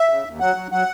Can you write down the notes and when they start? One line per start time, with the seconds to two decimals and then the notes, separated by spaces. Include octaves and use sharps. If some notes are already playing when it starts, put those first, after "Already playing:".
Already playing: E5
0.09 C#3
0.25 D#2
0.40 F#3 F#5
0.56 F#3
0.71 F#3 F#5